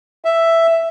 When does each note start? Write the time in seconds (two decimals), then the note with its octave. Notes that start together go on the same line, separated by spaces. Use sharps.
0.25 E5